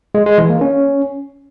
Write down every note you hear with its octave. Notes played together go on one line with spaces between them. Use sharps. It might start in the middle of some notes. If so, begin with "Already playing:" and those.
G#3
G#3
E3
A#3
C#4